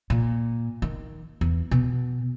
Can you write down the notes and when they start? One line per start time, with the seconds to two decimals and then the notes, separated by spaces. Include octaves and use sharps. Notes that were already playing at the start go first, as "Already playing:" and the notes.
0.10 A#2
0.82 D#3
1.41 E2
1.71 B2